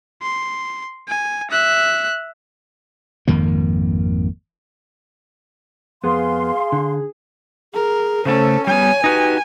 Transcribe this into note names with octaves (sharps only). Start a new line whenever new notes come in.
C6
G#5
E5 F#6
G#1 F2 D#3 A#3
F2 B3 G#4 F5 C6
D3
G#4 A#4
C#3 A3 C#4 A4 C5
G3 B3 C#5 G#5
D#4 F#4 G4 B4